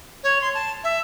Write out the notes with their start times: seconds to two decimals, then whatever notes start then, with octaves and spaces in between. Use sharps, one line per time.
0.23 C#5
0.41 C6
0.54 A5
0.84 E5